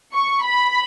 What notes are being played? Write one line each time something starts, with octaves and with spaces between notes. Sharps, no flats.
C#6
B5